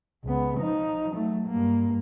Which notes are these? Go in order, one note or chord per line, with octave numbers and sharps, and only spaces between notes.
C#2 B3
F3 D#4
F#3 A3
G2 A#3